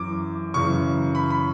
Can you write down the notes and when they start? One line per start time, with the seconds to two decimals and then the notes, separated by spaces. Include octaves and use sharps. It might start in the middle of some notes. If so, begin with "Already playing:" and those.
Already playing: F#2 E3 D6
0.54 F#2 C#3 E3 C#6
1.15 B5
1.30 B5